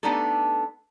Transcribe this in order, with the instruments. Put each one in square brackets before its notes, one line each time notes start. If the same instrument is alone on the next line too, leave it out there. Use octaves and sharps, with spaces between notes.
[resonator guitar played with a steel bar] A3 B3 D4 D#4 G4 A4